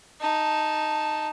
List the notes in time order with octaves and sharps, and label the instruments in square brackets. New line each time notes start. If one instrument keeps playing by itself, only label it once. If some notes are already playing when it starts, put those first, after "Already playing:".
[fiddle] D#4 A5